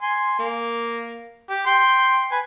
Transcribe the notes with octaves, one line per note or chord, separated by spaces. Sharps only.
G#5 C6
A#3
G4
G5 C6
B4 G#5